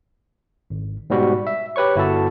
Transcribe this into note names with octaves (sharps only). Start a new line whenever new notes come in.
G#1
G#2 B2 G3 F#4
E5
G4 B4 C#5 C#6
G1 E4 F#4 A4 A5